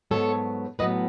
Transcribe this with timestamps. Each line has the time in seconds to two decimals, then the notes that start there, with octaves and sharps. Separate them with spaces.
0.11 G#2 F#3 B3 A4 C#5
0.79 A2 F#3 B3 B4 D#5